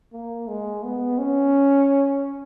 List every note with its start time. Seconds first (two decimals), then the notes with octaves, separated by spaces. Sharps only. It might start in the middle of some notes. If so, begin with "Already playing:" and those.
0.13 A#3
0.48 G#3
0.83 B3
1.18 C#4